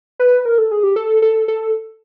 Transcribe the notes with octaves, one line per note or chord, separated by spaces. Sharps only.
B4
A#4
A4
G#4
G4
A4
A4
A4